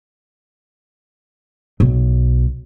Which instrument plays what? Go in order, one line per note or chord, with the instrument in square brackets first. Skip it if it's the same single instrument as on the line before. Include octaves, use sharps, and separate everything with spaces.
[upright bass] B1